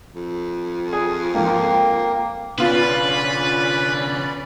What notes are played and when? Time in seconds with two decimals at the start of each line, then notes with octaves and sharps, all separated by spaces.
0.15 F2
0.93 G#4
1.34 G#2 F3 A#3 G5
2.58 C#3 B3 C#4 D4 F4 B4 D5 B5